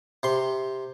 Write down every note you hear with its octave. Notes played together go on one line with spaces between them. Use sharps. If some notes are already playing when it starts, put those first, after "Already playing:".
C3 C6